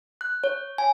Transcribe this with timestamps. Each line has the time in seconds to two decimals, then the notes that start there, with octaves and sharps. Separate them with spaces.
0.21 F#6
0.44 C#5
0.78 G#5